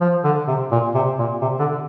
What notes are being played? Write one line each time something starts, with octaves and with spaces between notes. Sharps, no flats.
F3
D3
C3
A#2
C3
A#2
C3
D3